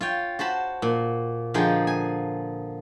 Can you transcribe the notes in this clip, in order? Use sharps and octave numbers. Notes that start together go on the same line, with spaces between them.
F4 C#5 G5
F#4 C5 A5 B5
A#2
D3 F3 D#4 F4 G#4 G5
G#5